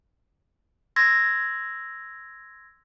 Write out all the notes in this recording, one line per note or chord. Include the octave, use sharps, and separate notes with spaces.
C6 E6 G#6 A#6